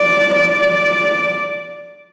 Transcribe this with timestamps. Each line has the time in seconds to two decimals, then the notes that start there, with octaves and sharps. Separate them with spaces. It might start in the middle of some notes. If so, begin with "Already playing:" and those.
Already playing: D5
0.36 D5